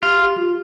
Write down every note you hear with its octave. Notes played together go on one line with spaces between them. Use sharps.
F4 G4
G4
F4